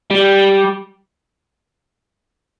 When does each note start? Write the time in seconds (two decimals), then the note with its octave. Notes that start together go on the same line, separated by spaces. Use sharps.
0.10 G3